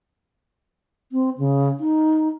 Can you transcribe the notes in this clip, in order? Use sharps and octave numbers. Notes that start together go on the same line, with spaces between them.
C4
C#3
D#4